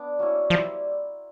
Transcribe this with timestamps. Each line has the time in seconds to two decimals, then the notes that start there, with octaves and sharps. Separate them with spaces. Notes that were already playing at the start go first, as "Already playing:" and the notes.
Already playing: B3 D4
0.19 F#3 A#3 C#4 E4
0.50 F3 G3 C4 E4